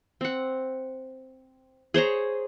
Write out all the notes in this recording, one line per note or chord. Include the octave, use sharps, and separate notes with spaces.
C4 F#5
G#4 C5 C#5 A#5